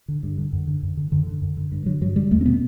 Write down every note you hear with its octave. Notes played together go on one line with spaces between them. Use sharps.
D3
G2
D3
F#2
D3
F#2
D3
F#2 D3
D3
F#2
D3
G2
D3 F#3
G2 F#3
D3 G3
E2 A3
C4
B2 B3